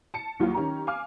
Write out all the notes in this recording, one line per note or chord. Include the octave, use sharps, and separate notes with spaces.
A5 C#7
D#2 F#3 G3 F4
D#3 C#4 G4 A#5
F5 G#5 D6 F6